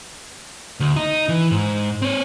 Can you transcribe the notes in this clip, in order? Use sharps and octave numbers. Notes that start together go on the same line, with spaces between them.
D2
D#4
E3
G#2
C4 C#5